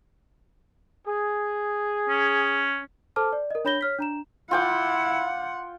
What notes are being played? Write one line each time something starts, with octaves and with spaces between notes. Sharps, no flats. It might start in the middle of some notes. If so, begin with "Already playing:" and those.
G#4
C#4
A4 C5 A5 D6 F6
D5
A#4 D#5
D4 C#5 B5 G6 A#6 G7
C#5 F6 B6
D4 A#5 E7
E4 F4 F#5 G5 D6